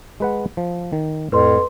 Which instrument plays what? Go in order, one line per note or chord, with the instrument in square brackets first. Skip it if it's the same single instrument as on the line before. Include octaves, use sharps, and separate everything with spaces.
[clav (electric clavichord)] G#3 B4 F#5
F3
D#3
[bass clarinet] F2 [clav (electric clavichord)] A2 [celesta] B4 C6